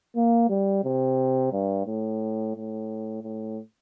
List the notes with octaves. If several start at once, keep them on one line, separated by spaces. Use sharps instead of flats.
A#3
G3
C3
G2
A2
A2
A2